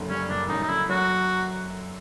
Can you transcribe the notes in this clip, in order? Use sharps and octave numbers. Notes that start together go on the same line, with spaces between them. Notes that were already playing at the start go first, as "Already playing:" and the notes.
Already playing: F#1 F#2 D3
G3 C#4
F#1 D4
F#2 D#4
D#4
D3 E4
F#3 F#4